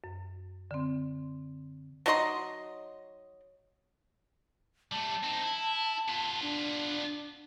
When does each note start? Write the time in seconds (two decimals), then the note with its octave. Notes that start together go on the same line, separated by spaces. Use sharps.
0.04 F#2
0.71 D3 C4
2.06 F#3 D#4 D#5 C6
4.92 G3 A3 A5
5.24 C4 D#4
5.44 E4
6.09 B3 F4
6.42 D4